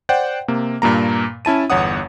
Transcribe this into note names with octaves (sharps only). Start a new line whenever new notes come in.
C5 D5 F#5 G5
C3 A#3
G2 A#2 A#3 A#5
C#4 E4 A5 D#7
G1 E2 C#5 F#5 D#6